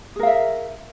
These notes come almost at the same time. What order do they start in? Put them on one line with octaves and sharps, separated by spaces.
G#4 A#4 F5 E5